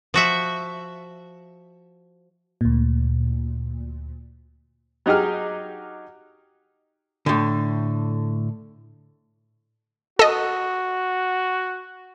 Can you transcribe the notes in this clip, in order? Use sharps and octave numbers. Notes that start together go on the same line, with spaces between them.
F3 F#4 E5
D2 A#2
F#3 D#4 G4 G#4 F6
A2 D3
F#4 A4 D#5